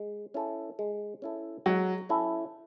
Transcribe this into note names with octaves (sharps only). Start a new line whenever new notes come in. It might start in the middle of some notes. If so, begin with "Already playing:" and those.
Already playing: G#3
C#4 E4 A4
G#3
C#4 E4 A4
F#3 G#3
C#4 E4 A4